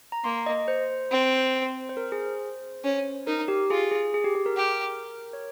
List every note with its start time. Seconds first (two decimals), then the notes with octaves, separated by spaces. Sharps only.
0.12 A#5
0.24 A#3 C6
0.46 D#5
0.68 C5
1.11 C4
1.89 C5
1.97 A#4
2.12 G#4
2.26 C5
2.84 C#4
3.27 D#4 A#4
3.48 G4
3.70 F4 G#4
3.92 G#4
4.14 G#4
4.24 G4
4.35 G#4
4.46 A#4
4.57 G4
5.33 C#5